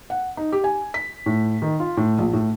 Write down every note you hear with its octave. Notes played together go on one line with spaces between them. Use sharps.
F#5
D#4
G4
G#5
B6
A2
D#3
F4
A2
A#1
A2